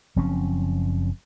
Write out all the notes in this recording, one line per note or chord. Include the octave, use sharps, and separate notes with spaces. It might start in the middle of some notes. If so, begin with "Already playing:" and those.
F#1 F3 C4 C#4